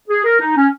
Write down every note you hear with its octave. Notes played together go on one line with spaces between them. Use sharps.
G#4
A#4
D#4
C#4